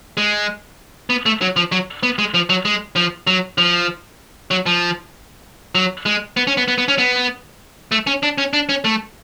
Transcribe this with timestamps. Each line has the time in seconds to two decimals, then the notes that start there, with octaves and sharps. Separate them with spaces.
0.17 G#3
1.10 B3
1.26 A3
1.41 F#3
1.56 F3
1.72 F#3
2.03 B3
2.18 G#3
2.34 F3
2.50 F#3
2.65 G#3
2.96 F3
3.27 F#3
3.58 F3
4.51 F#3
4.66 F3
5.75 F#3
6.06 G#3
6.37 B3
6.47 C#4
6.57 B3
6.68 B3
6.78 B3
6.88 C#4
6.98 B3
7.92 A3
8.07 C#4
8.23 D4
8.38 C#4
8.53 D4
8.69 C#4
8.85 A3